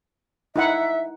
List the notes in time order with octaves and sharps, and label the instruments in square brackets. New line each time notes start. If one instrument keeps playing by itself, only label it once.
[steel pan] D#4 E4 F#5 [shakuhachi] E5